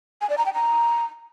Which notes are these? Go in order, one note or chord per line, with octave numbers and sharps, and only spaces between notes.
G#5
D5
A#5
G5
A#5